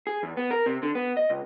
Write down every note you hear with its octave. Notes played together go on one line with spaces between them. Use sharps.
G#4
E2
B3
A#4
C3
D3
B3
D#5
C#2